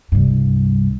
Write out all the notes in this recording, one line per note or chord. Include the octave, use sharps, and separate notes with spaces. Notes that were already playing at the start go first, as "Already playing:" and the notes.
C2 G2